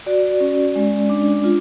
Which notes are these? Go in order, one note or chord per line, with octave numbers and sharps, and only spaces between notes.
F#4 D5
C#4
G#3
D4
F4